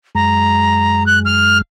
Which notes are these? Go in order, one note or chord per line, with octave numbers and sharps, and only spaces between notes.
F#2 G#3 A#5
F#6
F6